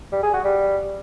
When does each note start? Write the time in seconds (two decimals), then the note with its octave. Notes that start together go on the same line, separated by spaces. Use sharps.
0.12 G3
0.23 G#4
0.33 F#4
0.44 G3